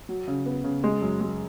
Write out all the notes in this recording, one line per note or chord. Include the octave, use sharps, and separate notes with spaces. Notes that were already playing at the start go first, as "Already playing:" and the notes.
F#3
C#3
B3
C#3
G#3
F#2
G#3